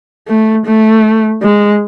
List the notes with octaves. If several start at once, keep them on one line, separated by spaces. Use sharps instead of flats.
A3
A3
G#3